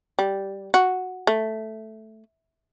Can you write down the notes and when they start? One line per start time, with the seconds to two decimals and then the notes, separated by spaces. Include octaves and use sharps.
0.19 G3
0.74 F#4
1.27 A3